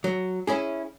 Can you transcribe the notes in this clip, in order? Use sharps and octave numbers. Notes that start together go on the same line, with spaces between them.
F#3
C#4 E4 G#4